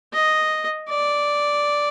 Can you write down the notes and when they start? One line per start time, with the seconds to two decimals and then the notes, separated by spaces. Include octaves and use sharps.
0.13 D#5
0.89 D5